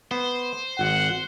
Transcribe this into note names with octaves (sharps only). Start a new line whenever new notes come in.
B3 C5
G#1 F#5